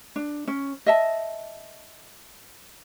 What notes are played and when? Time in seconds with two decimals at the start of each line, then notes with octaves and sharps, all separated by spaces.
0.16 D4
0.47 C#4
0.86 D#5 E5 A5